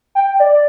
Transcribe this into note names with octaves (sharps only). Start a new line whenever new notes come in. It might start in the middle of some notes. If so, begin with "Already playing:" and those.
G5
D5